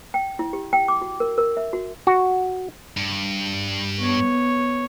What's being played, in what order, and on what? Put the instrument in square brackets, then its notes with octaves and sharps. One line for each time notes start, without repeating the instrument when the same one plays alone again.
[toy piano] G5
E4
G4
G5
D6
F#4
A#4
A#4
E5
F#4
[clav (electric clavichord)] F#4
[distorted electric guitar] G2
[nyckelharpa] B3 C#5